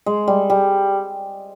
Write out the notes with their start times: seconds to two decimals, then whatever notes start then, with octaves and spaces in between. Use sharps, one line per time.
0.06 G#3
0.28 G3
0.50 G3